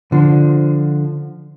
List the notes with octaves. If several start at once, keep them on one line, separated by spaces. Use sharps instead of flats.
D3 F3